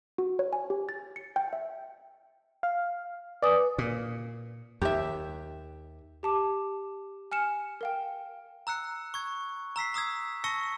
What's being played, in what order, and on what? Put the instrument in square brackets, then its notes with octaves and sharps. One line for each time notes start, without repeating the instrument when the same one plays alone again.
[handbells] F#4
C#5
G#5
G4
A6
C#7
G5
E5
[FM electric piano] F5
[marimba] B4 G#5 D#6 [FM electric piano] D5
[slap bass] A#2
[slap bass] D#2 [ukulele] G4 E5
[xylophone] G4 A5 D6
G#5 F6 C#7 E7
A#4 F5 G5
[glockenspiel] A#5 E6 F#6 C#7
C#6 G#6
A#5 E6 B6 C7
A#5 D#6 E6 G#6
A5 C#6 E6 A#6 C#7 G7